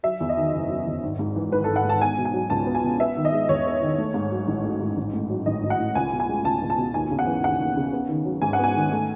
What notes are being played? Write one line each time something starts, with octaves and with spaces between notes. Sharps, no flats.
F#3 E5
E2
D#5
D#3
F#1
F#3
E2
G#1
G#2
E3
G#1 B4
A4
G#1
F#5
G#2 A5
B3 G#5
B2
G#5
F#3
C#2 A5
B3
G#5
B2
B3 E5
D#3
D#5
G#3
E2 C#5
B3
D#3
A3
G#2
F#3
A1
A3
G#2
A1
A2
F#3
A1 D#5
A1
F#5
A2
C#2 G#5
B2
G#5
G#3
C#2 A5
C#2
A5
B2
D#2 G#5
C#3
F#5
E3
D#2 F#5
D#2
C#3
B3
D#3
F#3
G#2 G#5
F#5
B3 G#5
D#3
A3